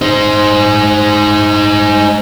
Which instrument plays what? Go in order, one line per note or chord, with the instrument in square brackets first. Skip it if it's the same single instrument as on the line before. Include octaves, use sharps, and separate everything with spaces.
[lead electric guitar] D#4 C5